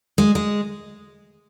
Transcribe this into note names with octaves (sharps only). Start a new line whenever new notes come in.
G#3
G#3